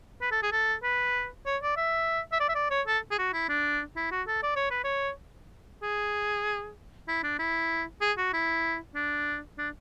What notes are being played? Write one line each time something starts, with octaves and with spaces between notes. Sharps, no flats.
B4
A4
G#4
A4
B4
C#5
D5
E5
E5
D5
E5
D5
C#5
A4
G#4
F#4
E4
D4
E4
F#4
A4
D5
C#5
B4
C#5
G#4
E4
D4
E4
G#4
F#4
E4
D4
D4